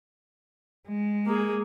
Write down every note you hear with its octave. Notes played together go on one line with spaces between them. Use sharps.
G#3
A#3 G#4